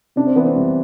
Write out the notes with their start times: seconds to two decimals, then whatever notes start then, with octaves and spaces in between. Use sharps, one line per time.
0.16 C3 D4
0.27 C4
0.35 E3 B3
0.47 C4
0.56 C2